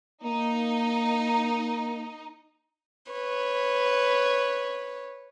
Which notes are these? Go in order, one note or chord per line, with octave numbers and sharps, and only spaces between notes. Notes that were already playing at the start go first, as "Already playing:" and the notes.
A#3 D#4
B4 C#5